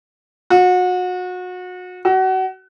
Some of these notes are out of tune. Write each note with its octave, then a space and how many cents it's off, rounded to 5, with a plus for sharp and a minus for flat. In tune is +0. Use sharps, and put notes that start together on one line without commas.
F#4 -30
F#4 +30